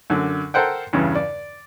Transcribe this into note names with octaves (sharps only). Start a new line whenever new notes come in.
F#2 D3
A4 A#4 C5 F#5 G5
E2 G2 C#3
D5